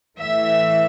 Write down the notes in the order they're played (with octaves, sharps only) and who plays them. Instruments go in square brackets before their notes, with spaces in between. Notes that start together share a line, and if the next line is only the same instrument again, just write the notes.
[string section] A2 E3 E5